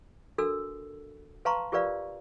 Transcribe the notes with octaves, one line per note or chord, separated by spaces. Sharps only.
D4 F#4 A4 A#4 E6
B4 F5 A5 A#5 C6 C#6
F4 G4 A#4 B4 D5 F5